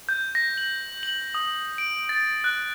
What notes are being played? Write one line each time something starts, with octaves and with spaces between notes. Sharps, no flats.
G6
A#6
F#7
F#7
D#6
D7
A6
F#6